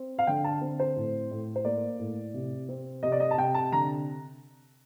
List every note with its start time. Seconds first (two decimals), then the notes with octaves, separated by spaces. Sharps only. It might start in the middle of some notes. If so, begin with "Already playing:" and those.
Already playing: C4
0.19 F5
0.27 D3 G5
0.44 A5
0.61 C4
0.80 C5
0.96 A2
1.31 A2
1.56 C5
1.65 A#3 D5
1.99 A2
2.34 C3
2.69 C4
3.03 C3 D#5
3.12 D5
3.20 D#5
3.31 A5
3.38 C3 G5
3.54 A5
3.72 D3 A#5